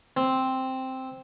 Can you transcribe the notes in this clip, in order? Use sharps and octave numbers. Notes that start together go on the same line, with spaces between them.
C4